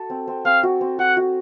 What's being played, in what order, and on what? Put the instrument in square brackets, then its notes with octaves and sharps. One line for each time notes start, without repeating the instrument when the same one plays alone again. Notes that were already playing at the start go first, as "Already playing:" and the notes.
Already playing: [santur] F#4 A4
C4
C4
[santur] C4 [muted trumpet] F5
[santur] F#4
C4
[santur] F#4 [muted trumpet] F#5
[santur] F#4